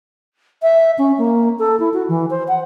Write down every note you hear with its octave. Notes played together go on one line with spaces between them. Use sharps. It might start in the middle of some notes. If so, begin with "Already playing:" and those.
E5
C#4
A#3
A4
E4
F#4
E3
C5
F#5